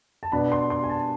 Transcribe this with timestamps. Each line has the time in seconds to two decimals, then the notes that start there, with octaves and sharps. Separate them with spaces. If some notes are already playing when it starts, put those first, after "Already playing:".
0.23 A5
0.32 B2 B3 D4 B5
0.52 C6
0.70 C6
0.84 G#5
0.90 A5